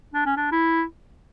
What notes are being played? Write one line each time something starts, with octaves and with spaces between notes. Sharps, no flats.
D4
C#4
D4
E4